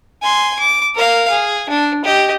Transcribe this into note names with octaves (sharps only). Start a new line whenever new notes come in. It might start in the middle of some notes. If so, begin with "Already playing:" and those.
G#5 C6
D6
A#4 F5
G#4
D4
G4 D#5